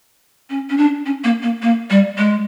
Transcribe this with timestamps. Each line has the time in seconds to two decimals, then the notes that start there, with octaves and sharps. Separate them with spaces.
0.50 C#4
0.69 C#4
0.78 D4
1.06 C#4
1.24 A#3
1.43 A#3
1.62 A#3
1.90 G3
2.18 G#3